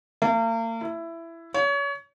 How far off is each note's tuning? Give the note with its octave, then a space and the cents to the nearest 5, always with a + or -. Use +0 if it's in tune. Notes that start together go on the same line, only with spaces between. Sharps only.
A#3 -40
E4 +15
C#5 +30